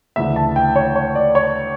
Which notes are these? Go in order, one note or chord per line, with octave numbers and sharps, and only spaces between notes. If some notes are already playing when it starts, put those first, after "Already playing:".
D2 C#3 E3 E5
A5
G5
C#5
C#5
D5
C#5